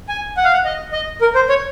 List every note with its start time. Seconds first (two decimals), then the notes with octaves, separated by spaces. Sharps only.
0.09 G#5
0.37 F#5
0.44 F5
0.53 F#5
0.65 D#5
0.92 D#5
1.21 A#4
1.35 C5
1.49 C#5